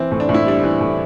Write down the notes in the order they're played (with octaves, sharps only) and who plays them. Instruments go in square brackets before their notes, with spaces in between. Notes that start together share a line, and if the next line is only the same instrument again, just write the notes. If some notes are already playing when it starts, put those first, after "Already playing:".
Already playing: [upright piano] E3 C4
A2
D4
A2
E4
G3 D4
E3
A2